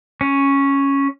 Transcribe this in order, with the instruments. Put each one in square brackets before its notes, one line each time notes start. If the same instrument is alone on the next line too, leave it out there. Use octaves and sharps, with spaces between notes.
[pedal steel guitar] C#4